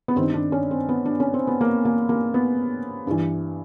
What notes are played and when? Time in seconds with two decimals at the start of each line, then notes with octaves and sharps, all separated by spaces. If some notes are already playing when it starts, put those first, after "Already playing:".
0.08 B3
0.16 G2 D#3 C4
0.34 D4
0.52 C#4
0.71 C4
0.89 B3
1.05 D4
1.20 C#4
1.34 C4
1.47 B3
1.61 A#3
1.85 A#3
2.09 A#3
2.34 B3
3.07 G2 E3